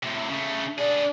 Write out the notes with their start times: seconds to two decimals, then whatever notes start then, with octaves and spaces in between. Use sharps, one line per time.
0.03 A2 C3
0.30 C#3 A3
0.78 D4 G#4 D5